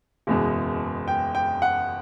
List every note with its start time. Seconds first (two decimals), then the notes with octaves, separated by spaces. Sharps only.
0.27 F#1 E2 B2 G#3
1.08 G5
1.35 G5
1.62 F#5